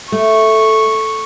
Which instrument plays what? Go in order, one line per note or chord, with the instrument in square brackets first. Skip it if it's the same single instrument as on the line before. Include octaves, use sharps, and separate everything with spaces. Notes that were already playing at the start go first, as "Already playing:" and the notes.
[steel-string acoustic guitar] A3 [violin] C#6